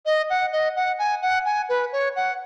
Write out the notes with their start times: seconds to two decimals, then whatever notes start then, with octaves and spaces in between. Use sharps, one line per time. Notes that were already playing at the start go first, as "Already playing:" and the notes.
0.06 D#5
0.30 F#5
0.52 D#5
0.76 F#5
0.99 G#5
1.22 F#5
1.45 G#5
1.69 B4
1.92 C#5
2.16 F#5